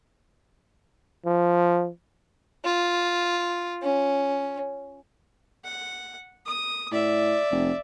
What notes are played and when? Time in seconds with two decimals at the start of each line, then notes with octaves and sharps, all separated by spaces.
1.25 F3
2.65 F4
3.82 C#4
5.64 F#5
6.46 D#6
6.92 A2 D5 E5
7.51 F1